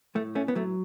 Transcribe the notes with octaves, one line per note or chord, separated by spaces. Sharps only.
A2 A3
A3 C#4
B3
F#3 A3